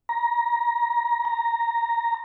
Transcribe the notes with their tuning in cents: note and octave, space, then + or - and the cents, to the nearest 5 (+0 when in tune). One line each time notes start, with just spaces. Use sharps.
A#5 +20
A#5 -5